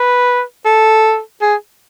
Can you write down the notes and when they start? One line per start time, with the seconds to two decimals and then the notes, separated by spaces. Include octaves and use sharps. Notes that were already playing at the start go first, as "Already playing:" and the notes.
Already playing: B4
0.66 A4
1.41 G#4